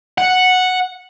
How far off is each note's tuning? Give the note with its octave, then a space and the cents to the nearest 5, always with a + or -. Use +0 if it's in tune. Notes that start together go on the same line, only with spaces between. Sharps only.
F#5 -5